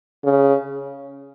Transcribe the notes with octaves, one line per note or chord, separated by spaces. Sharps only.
C#3